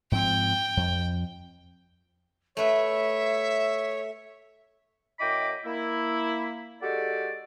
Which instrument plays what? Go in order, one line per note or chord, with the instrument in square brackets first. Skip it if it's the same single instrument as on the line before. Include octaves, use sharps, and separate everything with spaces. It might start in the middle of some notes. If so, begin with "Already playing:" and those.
[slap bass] G#2 F3 C4 [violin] G5
[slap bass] F2
[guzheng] A3 B4 [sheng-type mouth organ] C#5 [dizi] E5
[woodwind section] F#2 E4 D#5 G5 B5 D6
A#3 E4
G#3 F#4 G4 A4 D5